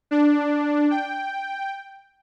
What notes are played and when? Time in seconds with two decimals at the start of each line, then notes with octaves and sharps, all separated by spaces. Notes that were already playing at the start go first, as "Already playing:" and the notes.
0.11 D4
0.91 G5